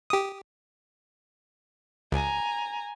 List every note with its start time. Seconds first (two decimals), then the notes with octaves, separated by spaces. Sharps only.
0.10 G4 D#6
2.12 C#2 G#5 A#5